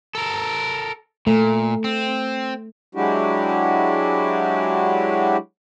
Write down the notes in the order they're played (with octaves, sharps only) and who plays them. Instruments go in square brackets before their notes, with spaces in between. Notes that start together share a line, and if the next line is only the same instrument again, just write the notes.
[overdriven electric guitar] A4 A#4
[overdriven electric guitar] A#2 [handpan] A3
[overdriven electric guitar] C4
[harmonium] F#3 G#3 D4 E4 F#4 G4